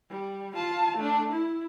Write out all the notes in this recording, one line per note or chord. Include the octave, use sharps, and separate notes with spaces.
G3
F4 A5
A3 D4
E4